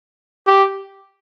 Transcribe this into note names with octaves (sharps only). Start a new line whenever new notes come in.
G4